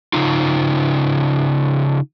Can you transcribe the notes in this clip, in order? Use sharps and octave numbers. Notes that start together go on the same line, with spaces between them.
C#3 D#4 F4